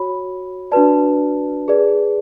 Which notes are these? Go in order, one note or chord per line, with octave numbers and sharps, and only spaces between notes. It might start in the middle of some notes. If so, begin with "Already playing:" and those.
Already playing: F#4 C#5 B5
D4 F#4 B4 D5 A5
G#4 B4 D5